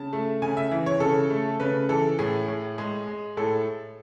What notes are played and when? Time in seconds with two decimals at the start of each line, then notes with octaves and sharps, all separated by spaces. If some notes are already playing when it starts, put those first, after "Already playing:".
Already playing: C#3 A5
0.13 A3
0.42 C#3 G#5
0.57 E5
0.71 E3
0.86 C#5
1.00 C#3 A4
1.30 A3
1.60 C#3 B4
1.89 E3 A4
2.19 A2 G#4
2.48 A2
2.78 G#3 G#4
3.07 G#3
3.37 A2 A4